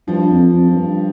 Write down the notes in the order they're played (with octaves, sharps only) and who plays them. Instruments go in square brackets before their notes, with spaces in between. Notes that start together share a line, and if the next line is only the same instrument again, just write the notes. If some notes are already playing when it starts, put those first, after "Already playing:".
[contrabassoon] G2 [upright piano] F3
[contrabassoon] F2
F2
F2
G2